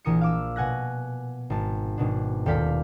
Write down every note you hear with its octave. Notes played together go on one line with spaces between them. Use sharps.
A#1 E3 A#4 D#6 C#7
F5 D6 E6
B2 F#5 G#5 F#6 A#6
G#1 A5
G#1 B2 D4
D#1 G4 A4 D5 F5 B6